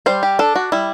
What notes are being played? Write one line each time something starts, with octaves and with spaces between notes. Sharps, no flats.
G3 C5
G4
D4 A4
F#4
G3 E4